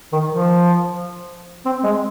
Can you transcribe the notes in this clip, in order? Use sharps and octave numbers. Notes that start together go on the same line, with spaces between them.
D#3
F3
C4
G#3